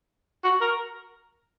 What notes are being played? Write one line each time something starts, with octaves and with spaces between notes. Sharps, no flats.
F#4
A#4